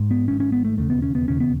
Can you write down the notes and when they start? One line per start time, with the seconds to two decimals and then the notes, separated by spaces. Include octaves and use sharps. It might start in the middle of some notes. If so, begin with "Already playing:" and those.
Already playing: G#2
0.11 B3
0.28 G#1 G#2 C#4
0.40 C#4
0.52 B3
0.65 A3
0.77 E1 D#2 C#3 A3
0.90 B3
1.02 C#4
1.15 B3
1.27 E1 D#2 C#3 C#4
1.40 B3